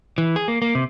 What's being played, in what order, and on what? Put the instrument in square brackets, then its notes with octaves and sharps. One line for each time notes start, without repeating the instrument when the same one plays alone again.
[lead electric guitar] E3
G#4
A#3
A#3
C3